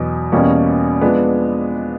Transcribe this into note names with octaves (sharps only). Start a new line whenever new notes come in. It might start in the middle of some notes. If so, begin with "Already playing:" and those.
Already playing: E2 B2 F#3
E2 B2 G3 A#3 C#4
F3 G#3 B3 D4